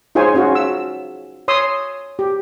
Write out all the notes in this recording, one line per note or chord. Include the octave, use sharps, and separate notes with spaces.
D#4 F4 G#4 C5 C#5 G#5
C#4 F4 F#4
E6
C#5 C6 D#6 E6
G4